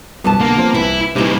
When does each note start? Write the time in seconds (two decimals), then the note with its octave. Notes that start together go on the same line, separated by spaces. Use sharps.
0.24 E1 C2 F#2 G3 B3 A5
0.41 B1 D3 A#3
0.58 F3 C4
0.75 C2 E3 E4
1.16 C3 E3 G3 A#3 D#4 E4